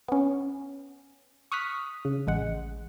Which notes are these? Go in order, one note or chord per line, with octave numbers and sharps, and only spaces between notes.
B3 C#4
C#6 D#6 F6 F#6 B6
C#3
A1 G#3 F#5